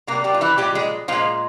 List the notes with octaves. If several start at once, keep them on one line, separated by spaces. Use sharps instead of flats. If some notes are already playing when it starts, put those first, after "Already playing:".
C3 G3 A#3 A#4
G3 G4
F4
E3 E4
A#2 F3 G3 G#3 G4
G#3 G#4
A#2 F3 G#3 F4